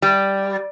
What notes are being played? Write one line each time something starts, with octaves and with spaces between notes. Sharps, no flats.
G3